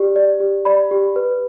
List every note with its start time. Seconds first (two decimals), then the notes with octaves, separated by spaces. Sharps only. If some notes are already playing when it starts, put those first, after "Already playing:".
Already playing: G4 D5
0.16 D5
0.40 G4
0.65 D5 B5
0.91 G4
1.16 B4